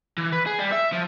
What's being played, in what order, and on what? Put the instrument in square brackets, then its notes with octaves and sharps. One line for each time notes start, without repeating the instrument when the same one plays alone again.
[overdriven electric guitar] E3
B4
G#4
G3
E5
F3